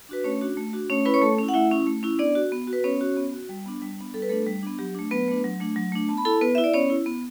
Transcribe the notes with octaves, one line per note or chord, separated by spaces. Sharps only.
D4 F#4 B4
A3 C#4 C#5
D4 F#4
A3
D4 F#4
A3 C#4 C#5
C#4 E4 B4 B5
C#5 C#6
A3 A4 A5
C#4 E4
F#5
A3 E4 E5
C#4 E4
A3
C#4 E4
B3 D4 D5
F#4
B3
F#4
B4
B3 C#4 C#5
F#4
B3
F#4
G3
B3 D4
G3
B3 D4
G3 A4
B4
A3 B3 D4 A4
G3
B3 D4
F#3 G4
A3 D4
F#3 B3 B4
A3 D4
F#3
A3 D4
F#3
A3 D4
B3 A5
B5
E4 A4 A5
B3 B4
E4 E5
D5
B3 C#4 C#5
E4
B3